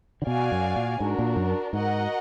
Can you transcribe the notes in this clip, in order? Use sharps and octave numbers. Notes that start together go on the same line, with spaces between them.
D3
B2 F#4 D5 F5 G#5
F#2
A#2
G#2 D4 F#4 A#4
A#2
F#2
G#2 F#4 A#4 D#5 F#5